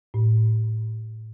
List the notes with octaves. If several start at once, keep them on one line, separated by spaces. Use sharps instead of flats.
A2